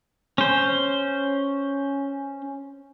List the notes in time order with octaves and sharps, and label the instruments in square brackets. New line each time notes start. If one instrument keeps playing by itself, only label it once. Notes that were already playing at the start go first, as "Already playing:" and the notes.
[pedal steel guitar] C#4 C5